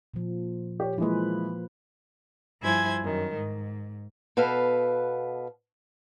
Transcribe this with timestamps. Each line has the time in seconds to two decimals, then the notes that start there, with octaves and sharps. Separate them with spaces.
0.14 A#2 F3
0.80 G4 C#5
0.98 E3 F3 G#3 A#3 B4
2.64 G2 F3 E4 C5 G#5 G#6
3.04 F#2 D#3
3.36 G#2
4.37 B2 A4 B4 F5